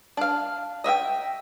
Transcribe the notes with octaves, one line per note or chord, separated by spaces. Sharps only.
D4 F5
D#5 E5 F#5 G5